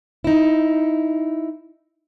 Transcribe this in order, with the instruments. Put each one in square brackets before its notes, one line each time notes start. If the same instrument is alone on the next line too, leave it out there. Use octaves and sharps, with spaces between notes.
[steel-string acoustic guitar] D#4 E4